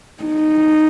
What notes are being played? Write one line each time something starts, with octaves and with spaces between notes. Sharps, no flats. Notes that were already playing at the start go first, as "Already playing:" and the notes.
D#4